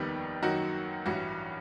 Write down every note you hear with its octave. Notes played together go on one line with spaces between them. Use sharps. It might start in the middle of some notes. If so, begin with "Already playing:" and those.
Already playing: F1 D#2 D#3 G3 B3 B4
F#2 D#3 F#3 A#3 D#4 F#4
A1 G2 E3 F#4